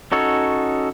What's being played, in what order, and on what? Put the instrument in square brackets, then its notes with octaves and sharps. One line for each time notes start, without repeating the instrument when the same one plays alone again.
[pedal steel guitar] C#4 D#4 F#4 A4 C#5